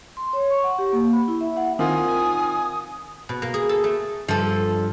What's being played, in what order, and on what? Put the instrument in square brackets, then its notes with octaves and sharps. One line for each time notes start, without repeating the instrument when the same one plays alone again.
[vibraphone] C6
C#5
C#6
F#5
G4
A#3
B5
E4
E5
F#5
[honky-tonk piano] D#3 [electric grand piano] C4 F4 [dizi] G#5 [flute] D#6
[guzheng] B2
A#3
G#4
A4
A3
[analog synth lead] G2 [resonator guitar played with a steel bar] F3 A4